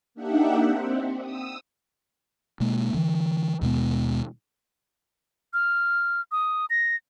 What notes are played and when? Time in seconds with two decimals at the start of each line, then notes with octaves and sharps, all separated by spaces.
0.15 A#3 D4 D#4 G4 E5 F#5
0.63 C4
1.21 D#6 E6
2.60 B2 G#3 A#3
2.94 D3 E3
3.61 D#2 B2 G#3 B3
5.54 F6
6.32 D#6
6.70 A#6